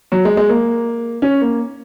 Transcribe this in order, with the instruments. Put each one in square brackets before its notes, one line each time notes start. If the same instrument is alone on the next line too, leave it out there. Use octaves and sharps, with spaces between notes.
[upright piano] F#3
G#3
G#3
A#3
C#4
A#3